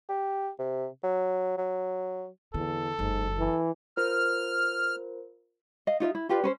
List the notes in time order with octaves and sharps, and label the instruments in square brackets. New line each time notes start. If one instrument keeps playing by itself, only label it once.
[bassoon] G4
C3
F#3
F#3
[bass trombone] E2 [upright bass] D3 [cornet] A4
[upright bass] F#1 [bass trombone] G#2
[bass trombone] E3
[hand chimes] F4 A#4 C5 [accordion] F6
[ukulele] D#5 F5
D#4 F4 D5 E5
E4
F4 G4 B4 D5
C#4 B4 C5